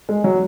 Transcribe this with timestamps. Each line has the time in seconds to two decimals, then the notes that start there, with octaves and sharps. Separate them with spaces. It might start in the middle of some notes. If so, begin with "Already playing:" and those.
0.09 G#3
0.24 F#3